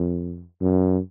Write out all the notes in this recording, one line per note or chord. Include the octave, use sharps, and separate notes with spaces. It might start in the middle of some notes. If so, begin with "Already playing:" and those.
Already playing: F2
F#2